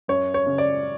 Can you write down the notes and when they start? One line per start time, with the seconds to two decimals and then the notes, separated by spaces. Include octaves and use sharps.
0.08 F#2 C#5
0.34 C#5
0.47 C#3
0.58 D5